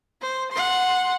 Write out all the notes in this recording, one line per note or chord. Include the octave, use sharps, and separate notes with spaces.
C5
F#5 C6